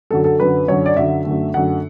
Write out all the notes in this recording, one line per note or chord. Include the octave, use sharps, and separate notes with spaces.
F#2 D3 F#3 A4
A4
F#2 D3 F#3 B4
F#2 D3 F#3 C#5
D5
F#2 D3 F#3 E5
F#2 D3 A3
F#2 D3 A3 F#5